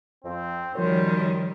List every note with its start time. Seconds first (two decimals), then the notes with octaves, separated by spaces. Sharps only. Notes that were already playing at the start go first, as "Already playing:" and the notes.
0.24 F2 C4
0.75 F#2 D#3 F3 G3 C5 C#5